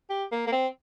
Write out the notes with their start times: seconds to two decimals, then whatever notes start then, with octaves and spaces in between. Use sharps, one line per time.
0.10 G4
0.32 A#3
0.47 A#3
0.52 C4